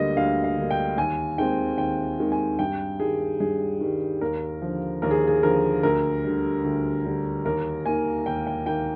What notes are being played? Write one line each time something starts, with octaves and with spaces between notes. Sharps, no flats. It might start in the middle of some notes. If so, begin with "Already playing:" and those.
Already playing: D2 D3 G3 A#3 D#5
D2 F5
F5
D3 G3 A#3
G5
D#2 G#5
D#3 G#3 C4 G5
D#2 G5
D#3 G#3 C4
G#5
G2 G5
D#3 G3 G#4
G2 G#4
D#3 G3
D#2 A#4
D3 F3
D#2 A#4
G#4
G#4
D3 F3 A#4
D2 A#4
D3 G3
D2
D3 G3
D#2 A#4
D#3 A#3 G#5
D#2 G5
G5
D#3 A#3 G5